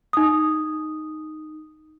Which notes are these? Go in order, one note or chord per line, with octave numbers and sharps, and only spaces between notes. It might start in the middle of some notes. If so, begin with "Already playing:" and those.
D#4 D#6